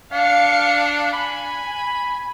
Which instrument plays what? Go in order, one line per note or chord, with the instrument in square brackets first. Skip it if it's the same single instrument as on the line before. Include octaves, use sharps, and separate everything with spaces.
[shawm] D4 [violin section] F5 C#7
[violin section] G#5 [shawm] B5